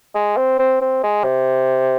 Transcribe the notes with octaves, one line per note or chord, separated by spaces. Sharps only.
G#3
C4
C4
C4
G#3
C3